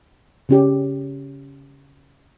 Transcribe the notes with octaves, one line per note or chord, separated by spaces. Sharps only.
C#3 C#4 G4